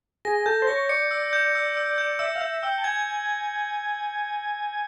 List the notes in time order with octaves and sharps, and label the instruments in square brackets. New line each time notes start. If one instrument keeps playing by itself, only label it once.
[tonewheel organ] G#4 [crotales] A#6
[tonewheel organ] A4 [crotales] G6
[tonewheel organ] C5
[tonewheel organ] C#5 [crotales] A#6
[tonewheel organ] D5 [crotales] C#7
[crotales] E6
G6
E6
E6
G6
[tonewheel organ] E5 [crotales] E6
[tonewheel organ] F5
[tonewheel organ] E5 [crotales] G6
[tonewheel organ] G5 [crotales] E6
[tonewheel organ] A5
[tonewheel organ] G#5 [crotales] G#6